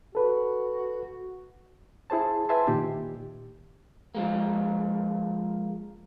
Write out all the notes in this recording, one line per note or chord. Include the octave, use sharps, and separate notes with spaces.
F#4 A4 B4
E4 G#4 C5 A5
B4 E5 G#5 A5 C6
A#2 D#3 G4
F3 G#3 A#3